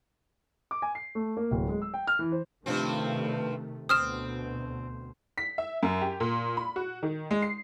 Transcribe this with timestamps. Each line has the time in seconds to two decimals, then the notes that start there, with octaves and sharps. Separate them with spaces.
0.71 D6
0.82 G#5
0.95 C7
1.15 A3
1.37 A#3
1.51 D1
1.69 G#3
1.82 E6
1.94 G5
2.07 F6
2.19 E3
2.32 C5
2.66 G2 C3 D#3 F3 A3 C4
3.89 D2 B2 C4 D#6 F6 E7
5.38 B6
5.58 E5
5.83 F#2
6.01 G4
6.20 A#2
6.57 B5
6.76 F#4
7.03 D#3
7.31 G#3
7.42 C7